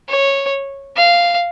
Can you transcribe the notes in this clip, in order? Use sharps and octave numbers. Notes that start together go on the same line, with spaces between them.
C#5
F5